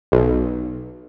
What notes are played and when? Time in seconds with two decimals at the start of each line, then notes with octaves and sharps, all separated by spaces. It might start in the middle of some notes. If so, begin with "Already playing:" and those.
0.12 B1